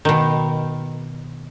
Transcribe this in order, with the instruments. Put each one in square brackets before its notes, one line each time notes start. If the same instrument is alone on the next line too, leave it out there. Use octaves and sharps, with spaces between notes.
[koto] B2 D#3